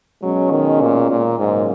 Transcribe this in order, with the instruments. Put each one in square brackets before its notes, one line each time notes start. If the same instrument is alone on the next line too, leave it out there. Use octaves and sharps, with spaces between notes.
[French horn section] B2 G#3 C#4 [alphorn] F#3
[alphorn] D#3
A#2
A#2
[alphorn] G#2 [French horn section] C#3 F#3 A#3 C#4